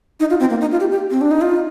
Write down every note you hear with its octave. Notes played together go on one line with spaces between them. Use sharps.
D#4
F4
C4
A#3
D#4
F4
G4
G4
C4
D4
D#4
F4